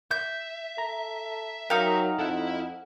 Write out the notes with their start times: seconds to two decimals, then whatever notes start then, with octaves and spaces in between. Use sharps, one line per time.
0.11 E5 G6
0.78 A4 A#5
1.70 F#3 D#4 A#4 F5 G5
2.19 F2 E4 A4 E5 F#5